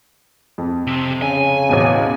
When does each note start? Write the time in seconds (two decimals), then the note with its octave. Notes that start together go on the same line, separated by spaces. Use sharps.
0.58 F2
0.87 C3
1.22 C#3 G#5
1.69 A1 E2 B2